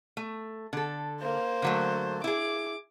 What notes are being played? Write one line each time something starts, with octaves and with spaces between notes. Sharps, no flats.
A3
D3 A4
A#3 C5
D3 F#3 A3
E4 G#4 D6